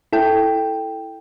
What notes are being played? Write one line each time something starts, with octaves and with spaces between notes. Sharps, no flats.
E4 A4 G5